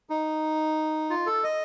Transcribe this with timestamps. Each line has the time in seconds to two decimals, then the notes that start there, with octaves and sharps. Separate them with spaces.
0.10 D#4
1.10 F4
1.26 A4
1.44 D#5